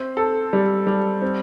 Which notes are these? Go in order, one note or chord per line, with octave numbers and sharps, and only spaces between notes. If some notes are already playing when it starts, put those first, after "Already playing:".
Already playing: C4
A4
G3
G3
C4